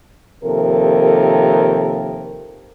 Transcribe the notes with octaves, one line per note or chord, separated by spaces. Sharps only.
D#2 C3 F3 A4 A#4